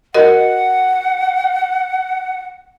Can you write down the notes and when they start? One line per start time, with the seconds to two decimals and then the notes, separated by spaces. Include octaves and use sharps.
0.15 F#4 A#4 D#5 F#5